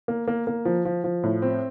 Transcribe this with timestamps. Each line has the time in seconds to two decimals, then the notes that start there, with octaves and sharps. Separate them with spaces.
0.08 A#3
0.28 A#3
0.47 A#3
0.65 F3
0.85 F3
1.04 F3
1.24 A2
1.42 C4